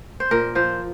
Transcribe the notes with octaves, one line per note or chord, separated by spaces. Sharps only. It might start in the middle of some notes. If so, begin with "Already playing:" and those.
C5
A#2 A#4
F3 C5